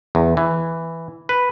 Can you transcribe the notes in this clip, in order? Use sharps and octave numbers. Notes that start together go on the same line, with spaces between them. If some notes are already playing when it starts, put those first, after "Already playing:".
E2
E3
B4